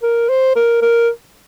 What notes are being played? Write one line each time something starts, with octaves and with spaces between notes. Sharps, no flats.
A#4
C5
A#4
A#4